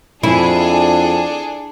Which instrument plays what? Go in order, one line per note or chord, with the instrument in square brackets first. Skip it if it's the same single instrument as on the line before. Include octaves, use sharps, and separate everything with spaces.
[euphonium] F2 [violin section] D4 G#4 A4 [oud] E4